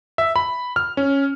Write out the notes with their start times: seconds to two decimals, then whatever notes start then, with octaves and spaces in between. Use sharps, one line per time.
0.18 E5
0.36 B5
0.76 F6
0.97 C#4